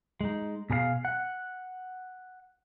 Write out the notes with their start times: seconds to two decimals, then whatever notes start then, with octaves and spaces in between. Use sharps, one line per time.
0.21 G#3 D#4
0.70 B2 G#4 A#4 F5
1.05 F#5